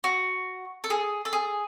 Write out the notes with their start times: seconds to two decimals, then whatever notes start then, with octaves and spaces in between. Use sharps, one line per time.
0.04 F#4
0.84 A4
0.90 G#4
1.25 A4
1.33 G#4